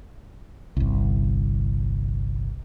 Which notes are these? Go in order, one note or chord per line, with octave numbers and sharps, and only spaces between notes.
G1 C2